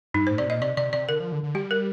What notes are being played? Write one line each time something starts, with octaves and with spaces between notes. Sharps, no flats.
G2 D#4
A2 C5
C3 D5
A#2 D#5
C3 D5
C3 D5
C3 D5
D3 A#4
F3
D3
D3
G3 G4
A#4